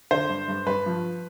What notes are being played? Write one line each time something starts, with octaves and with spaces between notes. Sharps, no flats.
D3 C5
G2
G2
G2 B4
F3